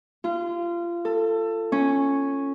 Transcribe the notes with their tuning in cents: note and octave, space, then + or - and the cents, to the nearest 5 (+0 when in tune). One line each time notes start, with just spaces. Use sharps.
F4 -25
A4 +20
C#4 -5